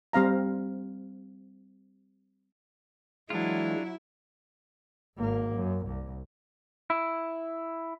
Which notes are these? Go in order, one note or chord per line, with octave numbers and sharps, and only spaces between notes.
G3 C4 F5 A#5
E3 F#3 G#3 D4 E4 F4
G#1 A#3
F#2
C2
E4